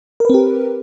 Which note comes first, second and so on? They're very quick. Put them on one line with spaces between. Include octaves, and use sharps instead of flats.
A#4 B4 C4 G4